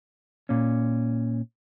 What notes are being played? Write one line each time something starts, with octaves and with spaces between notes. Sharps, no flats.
A#2 C#4